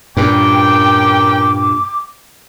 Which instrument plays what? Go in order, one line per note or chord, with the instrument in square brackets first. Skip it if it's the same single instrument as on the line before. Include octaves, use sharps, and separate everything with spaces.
[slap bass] G2 A#2 [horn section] C#4 A#4 G5 [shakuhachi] D6